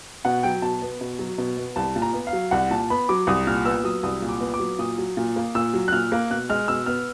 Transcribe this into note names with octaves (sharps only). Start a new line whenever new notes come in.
B2 F#5
F#3 G5
B2 A5
B3
B2
F#3
B2
B3
C2 A5
A#2
A#5
B3
F5
F#3
C2 F#5
A#2 A5
B3 B5
F#3 D6
C2 D#6
A#2 F6
B3 E6
F#3 D#6
C2 D#6
A#2
D6
B3
D6
F#3
A#2 D#6
F#3
A#2
A#3
A#2 E6
F#3
F#6
A#2 F6
A#3
B2 F#6
G#3 F6
B2 E6
B3 F6